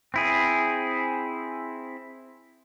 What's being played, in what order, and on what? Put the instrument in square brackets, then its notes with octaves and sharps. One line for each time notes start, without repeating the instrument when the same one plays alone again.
[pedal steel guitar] C4 E4 G#4